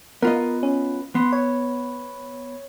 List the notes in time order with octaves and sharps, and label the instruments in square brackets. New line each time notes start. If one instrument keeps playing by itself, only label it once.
[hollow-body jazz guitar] B3 F4 D#5 [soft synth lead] A#4
[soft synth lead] C#4
[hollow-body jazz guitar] B3 [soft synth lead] C6
[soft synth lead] C#5